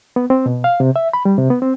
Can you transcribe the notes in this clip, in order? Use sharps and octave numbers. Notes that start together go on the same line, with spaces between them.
B3
C4
B2
F5
C3
E5
B5
G3
C3
B3
C4